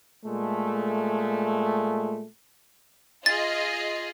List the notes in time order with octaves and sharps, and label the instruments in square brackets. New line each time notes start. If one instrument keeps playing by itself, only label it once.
[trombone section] A#2 G#3 A3
[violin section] F4 G#4 D#5 [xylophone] A6